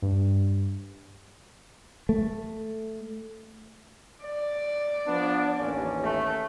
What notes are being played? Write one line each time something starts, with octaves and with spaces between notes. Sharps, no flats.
G2
A3
D5
F3 B3 D4
A1 D#2 C#4
A3